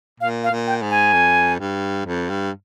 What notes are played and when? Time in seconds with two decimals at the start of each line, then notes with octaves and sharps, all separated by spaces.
0.20 A#2 F5
0.44 F5
0.51 A#2
0.67 G5
0.82 G#2
0.90 G#5
1.13 F2
1.60 G2
2.06 F2
2.30 G2